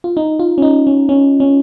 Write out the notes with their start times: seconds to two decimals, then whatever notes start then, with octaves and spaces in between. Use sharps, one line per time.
0.04 F4
0.17 D#4
0.39 F4
0.58 C#4
0.62 D#4
0.87 C#4
1.09 C#4
1.40 C#4